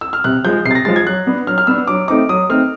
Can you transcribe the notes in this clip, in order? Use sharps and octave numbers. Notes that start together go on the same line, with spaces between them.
E6
F6
C3 F#6
F3 G#3 G6
C3 C7
A6
A#6
F3 G#3 A6
G#6
F#3 F#6
B3 D4
F#3 F6
F6
B3 D4 E6
F#3 D6
A3 C4 D#4 D6
F#3 D#6
A3 C4 D#4 F6